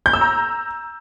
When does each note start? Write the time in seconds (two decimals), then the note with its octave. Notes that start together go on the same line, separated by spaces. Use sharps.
0.06 G6
0.13 E6
0.21 A#5